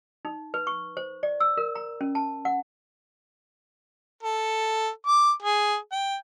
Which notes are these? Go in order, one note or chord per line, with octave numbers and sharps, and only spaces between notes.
D#4
B4
C#6
C5
D5
E6
A#4
A#5
C#4
A5
F#5
A4
D6
G#4
G5